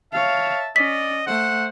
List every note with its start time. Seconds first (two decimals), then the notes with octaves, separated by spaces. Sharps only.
0.13 C#5 E5 F5 A5
0.76 C#4 D5 D#5 B6
1.27 A3 C5 F#5